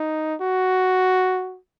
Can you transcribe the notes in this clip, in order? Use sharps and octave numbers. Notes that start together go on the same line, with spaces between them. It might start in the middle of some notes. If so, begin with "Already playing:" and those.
Already playing: D#4
F#4